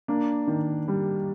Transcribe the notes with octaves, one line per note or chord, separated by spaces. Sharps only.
A#3 D4
D#3
G3